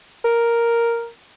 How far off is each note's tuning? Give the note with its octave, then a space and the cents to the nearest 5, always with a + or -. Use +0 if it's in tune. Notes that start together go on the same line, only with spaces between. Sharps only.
A#4 +0